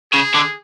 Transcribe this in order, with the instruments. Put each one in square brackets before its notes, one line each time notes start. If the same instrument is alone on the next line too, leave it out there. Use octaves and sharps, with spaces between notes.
[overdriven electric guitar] C#3 [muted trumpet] G#4
[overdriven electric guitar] D3